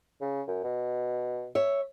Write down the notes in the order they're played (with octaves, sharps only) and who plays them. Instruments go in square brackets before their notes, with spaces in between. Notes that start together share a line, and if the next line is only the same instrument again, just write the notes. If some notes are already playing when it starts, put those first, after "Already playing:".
[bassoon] C#3
F#2
B2
[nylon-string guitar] C#5 E5